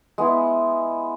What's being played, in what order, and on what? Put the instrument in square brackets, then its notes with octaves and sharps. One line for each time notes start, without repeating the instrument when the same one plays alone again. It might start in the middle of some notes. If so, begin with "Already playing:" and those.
[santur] G#3 B3 E4